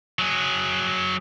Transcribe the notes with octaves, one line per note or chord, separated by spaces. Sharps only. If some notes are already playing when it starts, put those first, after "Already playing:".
F#3 G#4